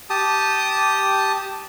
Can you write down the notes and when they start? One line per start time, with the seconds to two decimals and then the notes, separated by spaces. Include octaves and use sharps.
0.10 G4 A5 D#6